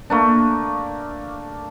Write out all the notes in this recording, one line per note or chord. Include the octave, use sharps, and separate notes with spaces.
A3 A#3 D4